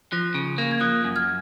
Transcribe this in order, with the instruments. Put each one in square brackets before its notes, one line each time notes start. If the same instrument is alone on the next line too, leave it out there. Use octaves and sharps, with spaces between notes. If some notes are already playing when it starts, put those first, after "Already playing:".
[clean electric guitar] F3 [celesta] F#6 A#6
[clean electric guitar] C#3
A#3
[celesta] G#6
[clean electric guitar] F3 [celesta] D#6 F#6
[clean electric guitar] F#2
[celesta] F6 G#6